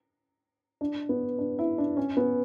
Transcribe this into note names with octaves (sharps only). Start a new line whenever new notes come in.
D4
B3
D4
E4
D4
C#4
B3